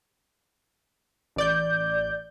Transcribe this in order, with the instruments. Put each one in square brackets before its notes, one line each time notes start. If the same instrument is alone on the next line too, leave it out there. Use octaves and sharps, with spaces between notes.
[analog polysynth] A1 D5 G6